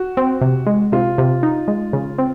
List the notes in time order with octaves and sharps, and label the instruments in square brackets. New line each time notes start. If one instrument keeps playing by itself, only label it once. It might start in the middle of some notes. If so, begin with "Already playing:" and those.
Already playing: [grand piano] F#4
[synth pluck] C4
C3
G#3
[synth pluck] C3 [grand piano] F4
[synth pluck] C3
D#4
G#3
C#3
C4